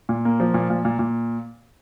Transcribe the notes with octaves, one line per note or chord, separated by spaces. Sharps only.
A#2
A#3
F3
A#2
A#2
A#2
A#2